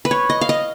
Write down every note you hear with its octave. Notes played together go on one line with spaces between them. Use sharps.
B4
C#5
D#5
F5
D#5